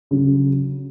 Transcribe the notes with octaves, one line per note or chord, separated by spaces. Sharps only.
C#3 F#3